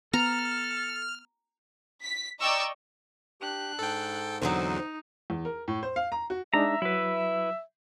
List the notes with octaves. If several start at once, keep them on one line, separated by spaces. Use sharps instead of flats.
B3 A4 A#5 F6
B6
D5 D#5 G5 A#5 C#6 E6
D4 G4 F#6
G#2 A4 G5
E2 D3 F#3 C4 D#4 C5
E2
A#4
A2
C5
F5
A#5
F#4
G#3 D4 D#4 E5 A#5
F#3 E4 B4